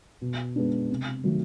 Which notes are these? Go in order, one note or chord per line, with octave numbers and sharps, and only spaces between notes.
B2
G#3 B3 D4
C3
D#3 F#3 A3